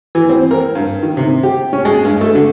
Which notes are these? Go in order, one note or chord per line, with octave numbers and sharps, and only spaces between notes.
E3
C4
A#4
G2
D#3
C3
G4
C#4
G#3
G2
A3
D3